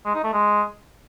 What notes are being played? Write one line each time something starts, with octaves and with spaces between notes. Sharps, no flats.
G#3
D#4
A3
G#3